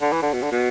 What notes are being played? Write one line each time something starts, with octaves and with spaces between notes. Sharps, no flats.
D3
E3
D3
B2
D3
B2